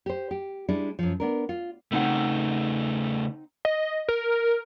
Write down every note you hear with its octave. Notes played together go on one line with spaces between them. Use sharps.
G4 C5
G4
G3 G#3 D4 E4
F#2 F3
B3 D4 A#4
F4
C#3 A3 C4 D#4 F#5
D#5
A#4